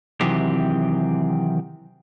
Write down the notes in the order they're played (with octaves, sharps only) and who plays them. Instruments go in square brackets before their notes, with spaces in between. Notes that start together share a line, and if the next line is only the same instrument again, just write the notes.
[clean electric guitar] C3 D#3 E3 F#3 C4 G4